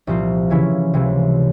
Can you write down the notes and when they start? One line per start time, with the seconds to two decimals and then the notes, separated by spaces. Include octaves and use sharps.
0.07 C2 A#2 F3 C4 F4
0.50 C#3 E3 A#3 C#4 E4
0.94 C#2 C3 E3